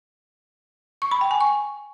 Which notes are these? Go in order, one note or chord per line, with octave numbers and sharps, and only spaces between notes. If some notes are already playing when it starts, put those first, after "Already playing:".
C#6
B5
G5
G#5
C#6